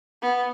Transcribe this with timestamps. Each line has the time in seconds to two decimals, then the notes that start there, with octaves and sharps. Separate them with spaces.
0.22 B3